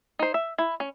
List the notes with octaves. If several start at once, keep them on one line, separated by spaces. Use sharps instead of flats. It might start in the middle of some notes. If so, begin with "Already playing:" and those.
D#4 C5
E5
E4
C#4